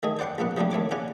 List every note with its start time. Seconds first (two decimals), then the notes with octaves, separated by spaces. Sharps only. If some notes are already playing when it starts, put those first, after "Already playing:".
0.03 D#3 A3 G#4 D#5
0.19 C5 D5 F#5 G5 C6
0.38 A#1 A#3 B3 F#5
0.57 C3 F3 G3 A3 D4
0.71 D#2 A3 C#5 D6
0.91 C#3 C#4 D5 F#5 G#5